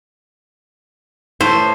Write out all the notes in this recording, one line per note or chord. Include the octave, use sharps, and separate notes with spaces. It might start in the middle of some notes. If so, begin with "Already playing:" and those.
A2 C5